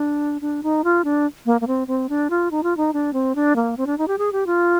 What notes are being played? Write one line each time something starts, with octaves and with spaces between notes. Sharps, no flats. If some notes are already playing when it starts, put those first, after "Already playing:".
Already playing: D4
D4
D#4
F4
D4
A#3
A#3
C4
C4
D4
F4
D#4
F4
D#4
D4
C4
D4
A#3
C4
D4
D#4
G4
G#4
G4
F4